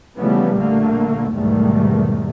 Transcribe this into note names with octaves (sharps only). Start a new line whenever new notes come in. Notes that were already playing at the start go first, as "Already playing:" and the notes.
C#3 E3 F3 G3 A3 B3
A#1 A#2 D3 A3 A#3
B1 E2 G#2 D#3 G3 A3